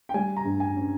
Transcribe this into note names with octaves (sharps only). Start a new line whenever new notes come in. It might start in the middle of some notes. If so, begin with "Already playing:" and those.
G5
G3 G#5
A#5
G2
G#5
C#4